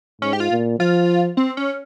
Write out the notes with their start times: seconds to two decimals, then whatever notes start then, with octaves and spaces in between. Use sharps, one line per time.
0.22 G#2 C#4
0.33 G4
0.40 F4
0.51 A#2
0.79 F3 F4
1.37 C4
1.57 C#4